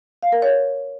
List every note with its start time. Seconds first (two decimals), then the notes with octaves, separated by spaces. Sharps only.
0.23 F5
0.32 A#4
0.42 C#5